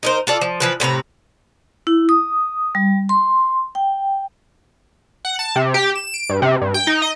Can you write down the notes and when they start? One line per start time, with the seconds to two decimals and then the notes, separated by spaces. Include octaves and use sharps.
0.03 D#4 A#4 C5
0.27 F4 A4 D5
0.41 F3
0.60 E3 F3 B4
0.80 A2 C3 B4 A#5
1.87 E4
2.09 D#6
2.75 G3
3.09 C6
3.75 G5
5.25 F#5
5.39 A5
5.56 C3
5.74 G4
5.95 E7
6.14 D7
6.29 G2
6.42 C3
6.61 G2
6.74 G5
6.87 D#4
7.02 D#5